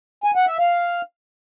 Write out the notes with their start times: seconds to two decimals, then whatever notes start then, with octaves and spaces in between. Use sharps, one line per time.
0.24 G#5
0.36 F#5
0.47 E5
0.59 F5